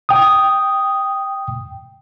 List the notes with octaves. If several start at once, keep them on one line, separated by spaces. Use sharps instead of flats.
G5 D#6